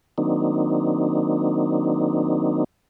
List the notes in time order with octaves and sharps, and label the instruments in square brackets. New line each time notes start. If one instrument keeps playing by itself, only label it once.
[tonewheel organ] D#3 F#3 A#3 C4 D4 D#4